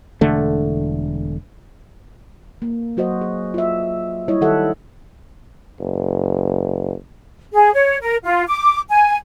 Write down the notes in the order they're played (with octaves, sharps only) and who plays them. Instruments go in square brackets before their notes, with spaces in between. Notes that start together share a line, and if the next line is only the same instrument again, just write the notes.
[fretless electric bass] E1 D3 A3
[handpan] A#3
F#3 F#4 C5 D#5
G#4
F4 E5
G3 E4 C#5 D#5
D#3 F#4 G4 A4 E5 F#5
[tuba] F#1
[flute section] G#4
C#5
A#4
F4
D6
G#5